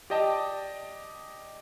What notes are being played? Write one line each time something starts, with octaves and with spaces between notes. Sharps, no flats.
G4 D5 D#5 G5 A5